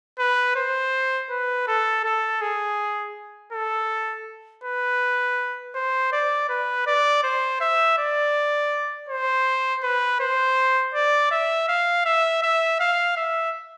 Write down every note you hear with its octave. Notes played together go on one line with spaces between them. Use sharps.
B4
C5
B4
A4
A4
G#4
A4
B4
C5
D5
B4
D5
C5
E5
D5
C5
B4
C5
D5
E5
F5
E5
E5
F5
E5